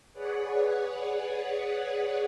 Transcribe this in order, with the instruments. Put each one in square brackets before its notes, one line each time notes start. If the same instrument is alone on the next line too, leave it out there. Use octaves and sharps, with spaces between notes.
[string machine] G#4 B4 C#5 D5 F#5